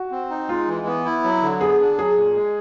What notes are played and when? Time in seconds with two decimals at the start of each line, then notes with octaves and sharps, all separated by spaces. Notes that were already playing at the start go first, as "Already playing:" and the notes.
Already playing: F#4
0.11 C4
0.30 D#4
0.49 G#3 F4
0.68 E3
0.87 B3
1.05 E4
1.24 F#3
1.42 D3
1.61 B3 G#4
1.79 D4
1.98 F#3 G#4
2.17 A#2
2.35 G#3